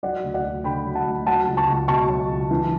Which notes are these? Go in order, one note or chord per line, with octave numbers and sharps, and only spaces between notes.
F#3 D5 F#5
D2
D5 F#5
D2
D3 G5 B5
F#3
F#5 A5
D2
F#3 F#5 A5
C#2
A5 C#6
C#2
B2 A5 C#6
F#3
C#2
E3